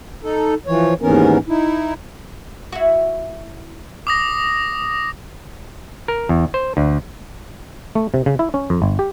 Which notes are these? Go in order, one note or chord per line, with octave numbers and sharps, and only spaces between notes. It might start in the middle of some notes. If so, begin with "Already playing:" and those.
D#4 A4
E3 F3 C#5
D#2 G#2 E3 B3 C#4 A#4
D#4 E4
E4 F#4
D6 D#6 A#6
A#4
E2
C5
D2
A3
C3
C#3
E4
C#4
F2
G1
G4